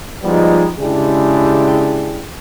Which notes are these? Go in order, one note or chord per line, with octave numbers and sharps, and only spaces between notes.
F3 G3 G#3 B3 D#4 F4
C#3 G#3 D4 E4 G4 G#4